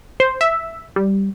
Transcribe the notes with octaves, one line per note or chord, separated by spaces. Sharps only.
C5
E5
G3